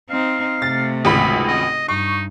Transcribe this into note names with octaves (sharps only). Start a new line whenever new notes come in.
C4 D#4 F5
C3 A3 A6
G#1 C#2 E5 B5
D#5
G2 D#4 C#6